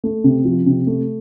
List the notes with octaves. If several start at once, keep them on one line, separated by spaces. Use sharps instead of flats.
A3
C3
F3
C3
A3